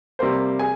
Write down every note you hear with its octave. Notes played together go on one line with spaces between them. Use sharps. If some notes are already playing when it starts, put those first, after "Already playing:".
C3 G3 A#3 C5 C6
G#4 G#5